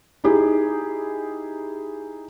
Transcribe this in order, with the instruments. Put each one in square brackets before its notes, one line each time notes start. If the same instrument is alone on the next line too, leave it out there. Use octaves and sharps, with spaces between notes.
[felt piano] D#4 E4 G4 G#4